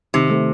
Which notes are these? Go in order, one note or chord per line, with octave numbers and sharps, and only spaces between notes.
C3 D#3
A3 C4